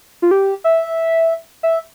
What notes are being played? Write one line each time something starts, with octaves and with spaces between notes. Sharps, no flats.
F4
G4
E5
E5